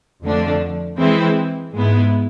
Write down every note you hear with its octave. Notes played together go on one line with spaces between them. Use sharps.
F2 D3 F3 A3 D4
E3 G#3 C4 E4
G#2 G#3 B3 E4